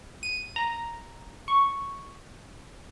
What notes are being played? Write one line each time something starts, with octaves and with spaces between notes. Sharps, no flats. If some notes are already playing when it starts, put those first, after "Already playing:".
D#7
A#5
C#6